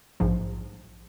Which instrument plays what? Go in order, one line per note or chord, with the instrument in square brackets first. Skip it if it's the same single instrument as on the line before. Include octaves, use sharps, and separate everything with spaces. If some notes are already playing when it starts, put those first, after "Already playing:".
[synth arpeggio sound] A#1 G#2 F3